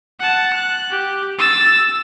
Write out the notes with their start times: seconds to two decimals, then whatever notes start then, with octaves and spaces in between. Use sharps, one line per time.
0.20 F#5 A5
0.54 F#6
0.91 G4
1.39 E6 A6